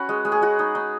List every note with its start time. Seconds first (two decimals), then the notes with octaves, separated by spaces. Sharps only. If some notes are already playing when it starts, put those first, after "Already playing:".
Already playing: C#4 F#4 B4
0.09 G#3
0.25 G#3
0.32 G#4
0.42 G#3 F#4
0.59 D#4
0.75 D#4